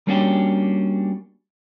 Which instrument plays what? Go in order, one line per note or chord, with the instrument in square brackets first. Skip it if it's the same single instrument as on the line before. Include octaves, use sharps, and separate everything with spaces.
[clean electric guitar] G3 A#3 C#4 D4 F#4 G4